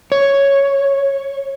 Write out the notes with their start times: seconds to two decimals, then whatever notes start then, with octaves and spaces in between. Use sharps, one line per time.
0.12 C#5